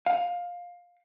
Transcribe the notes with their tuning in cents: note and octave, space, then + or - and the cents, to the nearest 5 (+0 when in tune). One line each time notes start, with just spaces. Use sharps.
F5 +15